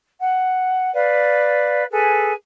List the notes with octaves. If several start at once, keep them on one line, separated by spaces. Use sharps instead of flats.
F#5
B4 D5 F5
G#4 A4 B4 G#5